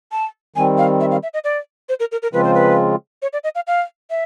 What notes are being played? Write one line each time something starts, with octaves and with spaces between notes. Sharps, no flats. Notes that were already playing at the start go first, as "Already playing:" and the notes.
A5
D#3 G3 C4 G#5
F5
E5
F5
E5
D#5
D5
C5
A#4
A#4
A#4
C#3 F3 G#3 C4 F4 B4
C5
B4
C#5
D5
D#5
F5
F5
E5